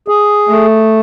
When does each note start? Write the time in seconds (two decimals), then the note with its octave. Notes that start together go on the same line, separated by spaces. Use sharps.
0.08 G#4
0.49 A3